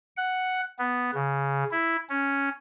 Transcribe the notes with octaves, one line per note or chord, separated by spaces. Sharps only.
F#5
B3
C#3
E4
C#4